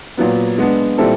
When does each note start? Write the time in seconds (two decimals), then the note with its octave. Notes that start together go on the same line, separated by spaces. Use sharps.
0.17 A#2 F#3 B3
0.58 G#3 B3 D4
0.98 A#2 G3 C4 E4 A4